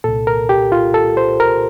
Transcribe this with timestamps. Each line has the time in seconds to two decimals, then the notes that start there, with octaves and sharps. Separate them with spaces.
0.04 C2 A#2 A4
0.27 A#4
0.49 G4
0.72 F4
0.94 A4
1.17 C5
1.40 A#4